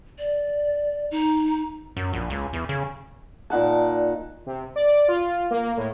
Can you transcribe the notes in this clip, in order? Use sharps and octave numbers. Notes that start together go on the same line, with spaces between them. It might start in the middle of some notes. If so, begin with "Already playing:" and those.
D5
D#4
F#2
A#1
C#2
E2
C#3
A#2 D#4 F#5 A5
C3
D5
F4
A#3
A2